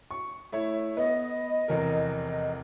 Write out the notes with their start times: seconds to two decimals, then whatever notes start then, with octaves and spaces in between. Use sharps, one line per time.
0.11 C#6
0.52 A3 E4 C#5
0.97 B3 D#5
1.68 F1 E2 A#4